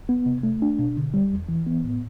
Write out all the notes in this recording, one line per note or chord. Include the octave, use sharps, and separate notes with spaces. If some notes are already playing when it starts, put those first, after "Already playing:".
B3
C3
A3
D4
B2
D3
G3
E2
E3
B3
A2